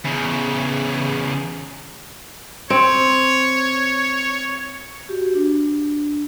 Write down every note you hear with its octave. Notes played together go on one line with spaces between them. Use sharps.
E2 C#3
C4 C#5
F#4 G4
D4